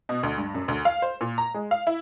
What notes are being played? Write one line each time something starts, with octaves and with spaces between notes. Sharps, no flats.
B2
D2
G2
F#2
D2
F5
C5
A#2
A#5
G#3
F5
E4